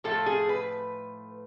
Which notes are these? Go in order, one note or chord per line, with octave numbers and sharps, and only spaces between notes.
A2 F3 A3 A4
G#4
B4